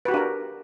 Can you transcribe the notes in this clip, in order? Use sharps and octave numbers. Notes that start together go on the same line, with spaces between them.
D4 F#4 G4 A#4 B4